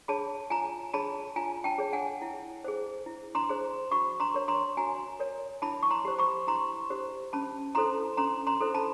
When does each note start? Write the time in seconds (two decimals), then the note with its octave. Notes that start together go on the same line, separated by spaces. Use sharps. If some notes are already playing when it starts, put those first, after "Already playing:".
0.08 G#4 C#5 A5 B5
0.50 F4 G#5 A#5
0.94 G#4 C#5 A5 B5
1.36 F4 G#5 A#5
1.64 G5 A5
1.78 G#4 C#5
1.93 F#5 G#5
2.22 E4
2.64 G#4 C5
3.06 E4
3.35 A#5 C6
3.49 G#4 C5
3.91 F#4 B5 C#6
4.20 A#5 C6
4.34 A#4 C#5
4.48 A#5 C6
4.77 F#4 G#5 A#5
5.20 A#4 C#5
5.62 E4 A5 B5
5.83 C#6
5.90 A#5 C6
6.05 G4 C5
6.19 B5 C#6
6.47 E4 A#5 C6
6.90 G4 C5
7.33 C#4 A5 B5
7.75 E4 A4 C5 A#5 C6
8.17 C#4 A#5 C6
8.47 A#5 C6
8.60 E4 A4 C5
8.74 A5 B5